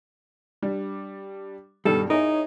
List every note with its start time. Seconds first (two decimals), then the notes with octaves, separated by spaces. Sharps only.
0.62 G3 D4
1.85 G2 B2 D#3 G3 A4
2.10 D#4 E4 G#4 A#4 C#5